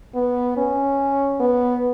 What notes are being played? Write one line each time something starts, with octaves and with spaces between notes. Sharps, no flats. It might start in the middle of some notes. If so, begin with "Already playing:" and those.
B3
C#4
B3